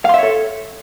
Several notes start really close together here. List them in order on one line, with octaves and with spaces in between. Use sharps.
F5 C6 E5 C#5 A4